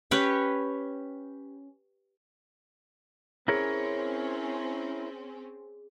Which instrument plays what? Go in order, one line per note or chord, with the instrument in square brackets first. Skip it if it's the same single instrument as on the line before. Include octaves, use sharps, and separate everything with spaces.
[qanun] C#4 G4 B4 C#5
[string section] C4 C#4 [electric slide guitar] E4 A#4 C#5 [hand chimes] G#4